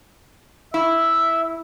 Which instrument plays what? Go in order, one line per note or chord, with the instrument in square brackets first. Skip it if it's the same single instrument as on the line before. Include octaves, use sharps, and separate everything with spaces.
[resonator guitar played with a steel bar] E4 [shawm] E5